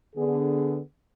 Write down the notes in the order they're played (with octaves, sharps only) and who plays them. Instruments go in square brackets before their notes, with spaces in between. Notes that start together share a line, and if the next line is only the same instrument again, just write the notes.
[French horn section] D3 B3 G#4